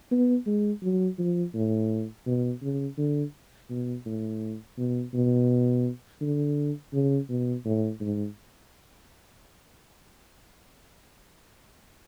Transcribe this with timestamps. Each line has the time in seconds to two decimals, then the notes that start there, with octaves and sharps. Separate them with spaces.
0.11 B3
0.47 G#3
0.83 F#3
1.19 F3
1.55 A2
2.26 B2
2.62 C#3
2.98 D3
3.70 B2
4.06 A2
4.78 B2
5.14 B2
6.21 D3
6.93 C#3
7.29 B2
7.65 A2
8.01 G#2